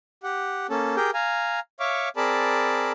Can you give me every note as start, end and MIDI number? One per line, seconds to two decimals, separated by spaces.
0.23 0.67 67
0.23 0.67 78
0.70 0.96 58
0.70 0.96 61
0.70 0.96 69
0.96 1.11 67
0.96 1.11 68
0.96 1.11 70
0.96 1.11 79
1.14 1.60 77
1.14 1.60 80
1.14 1.60 82
1.80 2.09 73
1.80 2.09 76
1.80 2.09 77
1.80 2.09 85
1.80 2.09 86
2.17 2.92 60
2.17 2.92 68
2.17 2.92 70
2.17 2.92 74
2.17 2.92 81
2.17 2.92 83